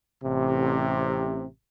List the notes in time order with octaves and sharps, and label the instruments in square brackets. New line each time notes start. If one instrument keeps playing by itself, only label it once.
[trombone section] A1 C3